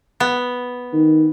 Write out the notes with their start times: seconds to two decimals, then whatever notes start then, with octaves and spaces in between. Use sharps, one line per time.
0.20 B3
0.93 D#3